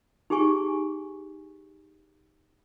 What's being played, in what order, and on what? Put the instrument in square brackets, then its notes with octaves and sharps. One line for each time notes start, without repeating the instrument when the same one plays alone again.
[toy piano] D#4 G4 G#4 G#5 C#6